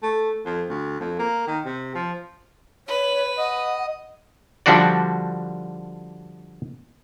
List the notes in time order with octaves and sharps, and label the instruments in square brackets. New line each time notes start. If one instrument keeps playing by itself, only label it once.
[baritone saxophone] A3
F2
D2
F2
A#3
D#3
C3
F3
[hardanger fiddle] B4 [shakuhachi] C#5
[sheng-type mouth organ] D#5 [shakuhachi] F#5
[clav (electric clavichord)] D3 F3 G3 D4 F#4 D5